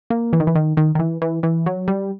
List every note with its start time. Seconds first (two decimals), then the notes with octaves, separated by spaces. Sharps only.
0.10 A#3
0.33 E3
0.40 D#3
0.47 E3
0.55 D#3
0.77 D#3
0.95 D#3
0.99 E3
1.22 E3
1.43 E3
1.66 F#3
1.88 G3